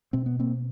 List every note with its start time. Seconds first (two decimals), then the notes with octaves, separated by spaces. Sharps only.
0.13 B2 C4
0.26 B3
0.40 A#3 C4